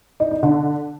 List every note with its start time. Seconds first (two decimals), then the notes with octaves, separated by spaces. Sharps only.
0.20 D#4
0.31 D#4
0.43 D3